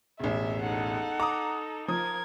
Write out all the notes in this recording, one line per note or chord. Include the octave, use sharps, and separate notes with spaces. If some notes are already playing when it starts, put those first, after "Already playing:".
E1 A1 E5
D#4 A4 F#5
A#5 D6 D#6
F3 A#4 D#6 G#6